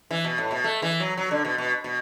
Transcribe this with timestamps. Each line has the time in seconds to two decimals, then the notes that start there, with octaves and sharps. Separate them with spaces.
0.11 E3
0.24 B2
0.38 A2
0.51 B2
0.64 A3
0.82 E3
1.00 F#3
1.17 F#3
1.31 D3
1.45 B2
1.58 B2
1.84 B2